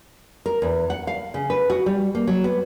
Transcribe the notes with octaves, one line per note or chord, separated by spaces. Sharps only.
A#4
E2
F#5
F5
C#3
B4
F#4
G3
A#3
F#3
B3